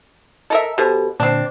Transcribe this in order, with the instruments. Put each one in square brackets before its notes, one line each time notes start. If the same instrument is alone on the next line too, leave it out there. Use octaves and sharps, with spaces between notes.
[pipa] A4 A#4 E5 [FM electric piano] D#5
[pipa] B2 [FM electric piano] G4 A4 C5
[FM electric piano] A#2 D3 [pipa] C4 D4